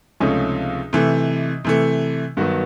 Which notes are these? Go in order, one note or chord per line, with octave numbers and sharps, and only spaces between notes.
C#2 C3 F3 A3 C#4 D#4
C3 E3 A3
C3 E3 A3
G2 D#3 F#3 B3 F#4